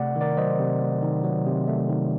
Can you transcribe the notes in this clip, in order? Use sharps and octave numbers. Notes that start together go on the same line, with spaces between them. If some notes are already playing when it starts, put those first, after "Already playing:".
Already playing: C3 A3 D5 F#5
D#3
A#4 D5
F#3 C5 D#5
C3
A3
D#3
F#3
C3
A3
D#3